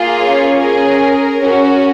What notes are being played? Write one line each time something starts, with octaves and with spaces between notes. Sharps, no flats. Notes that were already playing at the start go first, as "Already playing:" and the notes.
Already playing: A#3 F4 G#4
C#4 C#5
C#4 G#4 A#4
C#4 F#4